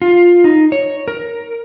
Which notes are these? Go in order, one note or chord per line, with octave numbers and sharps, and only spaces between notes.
F4
D#4
C#5
A#4